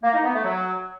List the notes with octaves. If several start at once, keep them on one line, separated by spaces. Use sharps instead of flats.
A#3
D#4
B3
A3
F#3